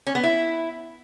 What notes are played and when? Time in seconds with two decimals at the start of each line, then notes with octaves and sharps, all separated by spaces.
0.07 C#4
0.15 B3
0.24 E4